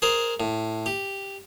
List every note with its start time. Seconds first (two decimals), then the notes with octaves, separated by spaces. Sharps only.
0.02 G#4 A#4 C5
0.40 A2
0.86 G4